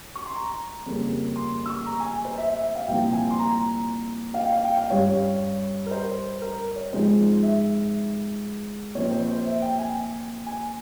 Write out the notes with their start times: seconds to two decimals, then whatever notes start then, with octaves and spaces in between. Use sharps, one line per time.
0.15 C#6
0.26 C6
0.35 A#5
0.86 F2 C#3 G3 A#3
1.36 C6
1.66 E6
1.70 C#6
1.86 A#5
2.00 G#5
2.12 G#5
2.25 C5
2.38 E5
2.49 E5
2.63 E5
2.75 F5
2.88 C2 A#2 F3 C4 G5
3.13 G#5
3.31 C6
3.39 A#5
4.34 F5
4.39 G5
4.52 F5
4.65 G5
4.77 F5
4.90 G2 G3 C#4 C#5
5.86 A#4
5.91 C5
6.42 A#4
6.76 C#5
6.92 G#2 F3 G#3 C4 C5
7.42 E5
8.95 A#2 F3 C4 C#5
9.11 C5
9.28 C5
9.45 E5
9.62 G5
9.73 G5
9.79 G#5
10.46 G#5